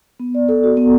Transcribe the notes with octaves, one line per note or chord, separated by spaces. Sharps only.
B3
D5
A4
F#4
B3